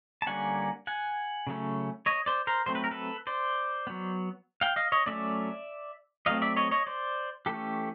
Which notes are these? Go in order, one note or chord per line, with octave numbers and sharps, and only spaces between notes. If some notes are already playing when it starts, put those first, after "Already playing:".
A5
D3 G3 A#3 C#4 F#5 G#5
F#5 G#5
C#3 F#3 A3 C#4
C#5 D#5
C5 D5
A#4 C5
F#3 A3 C4 C5
B4
A#4
A4 B4
C5 D5
F#3 B3
F5 G5
D#5 F5
C#5 D#5
F#3 A3 C#4 D5 E5
F#3 A3 C4 D#5 F5
D5 E5
C#5 D#5
C#5 D#5
C5 D5
E3 A3 C#4 G4 A4